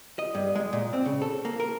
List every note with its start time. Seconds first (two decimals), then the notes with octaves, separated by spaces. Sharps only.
0.19 D#5
0.35 G2
0.55 G#3
0.73 A#2
0.93 C4
1.06 C#3
1.22 A4
1.45 A#3
1.60 A#4